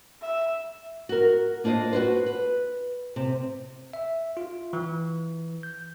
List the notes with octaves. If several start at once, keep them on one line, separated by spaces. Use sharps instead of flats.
E5
F#4 A#4
A#3 D4 F4 C5 D#5
F#4 G4 B4 C5
B4
C3
E5
F4
E3
G6